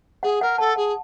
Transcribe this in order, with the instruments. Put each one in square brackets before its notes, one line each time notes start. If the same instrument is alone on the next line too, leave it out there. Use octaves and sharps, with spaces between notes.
[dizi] G#4 [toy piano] F#5
[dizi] A#4 [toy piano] F#5
[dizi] A4 [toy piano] A5
[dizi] G#4 [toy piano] F#5